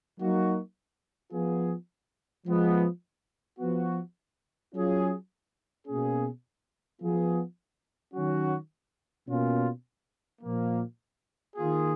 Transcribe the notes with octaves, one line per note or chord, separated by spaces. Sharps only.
F#3 A#3 D#4 F#4
F3 B3 F4 G#4
F3 G#3 B3
F3 B3 F#4
F#3 C#4 F4 G#4
B2 A#3 C#4 G#4
F3 B3 F4 G#4
D#3 F#3 C#4 F#4
B2 A#3 C#4 F4
A#2 F3 A#3
D#3 A#3 F4 G#4